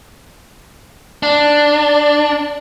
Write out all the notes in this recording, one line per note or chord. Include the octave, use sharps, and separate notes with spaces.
D4